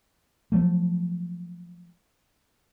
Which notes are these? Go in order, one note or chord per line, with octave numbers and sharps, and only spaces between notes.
F3 F#3 A3